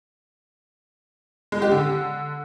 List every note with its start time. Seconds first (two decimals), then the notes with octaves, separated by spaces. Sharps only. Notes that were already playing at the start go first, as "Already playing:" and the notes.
1.52 G#3
1.62 G4
1.71 D3